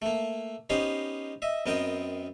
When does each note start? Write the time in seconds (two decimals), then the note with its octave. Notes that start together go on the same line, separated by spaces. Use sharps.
0.02 A3 A#3
0.70 B3 C#4 D#4 G4 C5
1.42 D#5 E5
1.66 F#2 B3 C4 A#4 D#5 G5